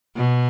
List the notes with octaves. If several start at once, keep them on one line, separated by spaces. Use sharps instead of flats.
B2